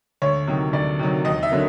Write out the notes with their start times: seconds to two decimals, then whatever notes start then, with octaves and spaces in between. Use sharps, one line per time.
0.22 D2 C#5
0.47 C3 D#3 F#3
0.73 D2 D5
0.99 C3 D#3 F#3
1.25 D#2 D#5
1.43 E5
1.51 D3 F#3 A#3